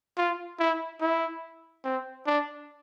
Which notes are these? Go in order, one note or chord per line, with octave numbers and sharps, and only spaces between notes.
F4
E4
E4
C4
D4